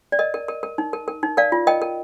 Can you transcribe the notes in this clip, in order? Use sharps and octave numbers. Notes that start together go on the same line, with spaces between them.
D5
A#4 D#5
A#4
A#4
A#4
D#4
A#4
A#4
D#4
A#4 D5 F5
F4
A#4 D#5 G5
A#4